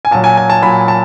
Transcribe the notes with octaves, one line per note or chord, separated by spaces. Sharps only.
G#5
A#2 F#3 A5
G#5
G#5
A5
A#2 F#3 B5
A5